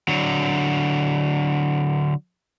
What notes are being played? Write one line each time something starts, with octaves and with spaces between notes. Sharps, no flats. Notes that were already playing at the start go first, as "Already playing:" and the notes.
D3 F#3